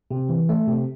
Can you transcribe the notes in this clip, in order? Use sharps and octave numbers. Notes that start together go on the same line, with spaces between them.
C3
E3
A3
C3